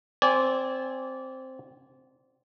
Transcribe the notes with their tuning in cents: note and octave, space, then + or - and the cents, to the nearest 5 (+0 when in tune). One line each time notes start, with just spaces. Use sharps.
C4 +0 D5 -20 G#5 -5